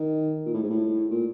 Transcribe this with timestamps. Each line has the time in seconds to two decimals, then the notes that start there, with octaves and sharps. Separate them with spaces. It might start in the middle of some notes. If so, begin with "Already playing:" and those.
Already playing: D#3
0.46 A#2
0.53 A2
0.62 G#2
0.70 A2
1.11 A#2